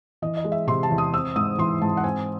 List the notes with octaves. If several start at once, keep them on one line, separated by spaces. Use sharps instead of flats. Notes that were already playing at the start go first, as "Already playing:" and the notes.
E3 D#5
D#5
G#3
E5
C3 C6
A5
E2
D#6
C4 E6
G#2 D#6
E3 C6
G#2 A5
F#5
C4 G#5